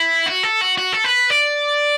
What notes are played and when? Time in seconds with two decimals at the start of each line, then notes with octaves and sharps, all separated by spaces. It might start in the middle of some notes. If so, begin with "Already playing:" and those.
Already playing: E4
0.26 F#4
0.43 A4
0.61 F#4
0.78 F#4
0.93 A4
1.04 B4
1.30 D5